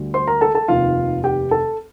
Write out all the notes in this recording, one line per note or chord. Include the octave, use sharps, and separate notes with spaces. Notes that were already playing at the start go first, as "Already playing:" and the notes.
Already playing: D2 D3 G3
C5 C6
A#4 A#5
A4 A5
A4 A5
F1 D#2 D#3 F4 F5
G4 G5
A4 A5